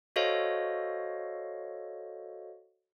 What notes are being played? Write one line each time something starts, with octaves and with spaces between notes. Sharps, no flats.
F#4 A4 C5 C#5 D#5 F5